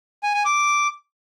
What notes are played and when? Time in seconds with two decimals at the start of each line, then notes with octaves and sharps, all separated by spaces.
0.23 G#5
0.34 G#5
0.45 D6